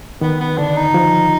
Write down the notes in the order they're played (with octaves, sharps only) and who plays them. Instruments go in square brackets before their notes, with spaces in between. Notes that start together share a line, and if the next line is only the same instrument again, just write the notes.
[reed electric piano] D#3 [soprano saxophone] B3
[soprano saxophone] B3
[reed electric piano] D3 [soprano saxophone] D4
[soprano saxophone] D#4
[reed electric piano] F3